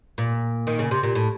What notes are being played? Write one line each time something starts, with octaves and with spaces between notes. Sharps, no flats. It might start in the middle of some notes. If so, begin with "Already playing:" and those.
A#2
D#3
C#3
C3
A#2
A2